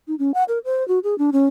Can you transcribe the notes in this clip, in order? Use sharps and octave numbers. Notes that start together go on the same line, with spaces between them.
D#4
C#4
F#5
A#4
C5
F#4
G#4
D4
C#4